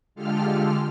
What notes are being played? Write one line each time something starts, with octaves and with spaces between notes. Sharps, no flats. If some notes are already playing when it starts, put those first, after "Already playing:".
D3 G#3 F4 G4 A4 F6